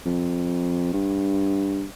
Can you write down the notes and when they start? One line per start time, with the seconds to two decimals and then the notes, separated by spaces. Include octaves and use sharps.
0.05 F2
0.93 G2